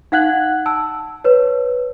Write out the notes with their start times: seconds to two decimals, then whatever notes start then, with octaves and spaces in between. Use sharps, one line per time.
0.12 D#4 F5 F#5 F#6 G#6 F#7
0.66 A5 E6
1.24 B4 C#5